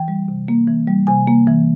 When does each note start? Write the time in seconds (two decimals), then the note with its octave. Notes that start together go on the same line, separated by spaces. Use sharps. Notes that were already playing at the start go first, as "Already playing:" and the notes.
Already playing: E3 G5
0.08 G3
0.28 C3
0.48 A#3
0.67 E3
0.88 G3
1.07 C3 G#5
1.27 A#3
1.47 E3